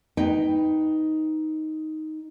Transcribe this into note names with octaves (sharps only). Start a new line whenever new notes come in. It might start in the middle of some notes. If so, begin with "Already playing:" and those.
D#4 B4 G5